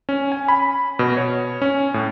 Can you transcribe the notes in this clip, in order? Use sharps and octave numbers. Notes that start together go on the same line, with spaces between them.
C#4
G#5
B5
B2
C#5
C#4
A2